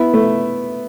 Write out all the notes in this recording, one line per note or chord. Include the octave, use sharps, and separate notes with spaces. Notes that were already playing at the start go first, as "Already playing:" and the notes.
Already playing: B3 E4
A3